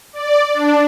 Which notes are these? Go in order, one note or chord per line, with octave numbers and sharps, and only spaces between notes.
D5
D4